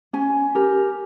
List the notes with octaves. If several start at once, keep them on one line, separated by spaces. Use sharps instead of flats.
C#4 G#5
G4 A#4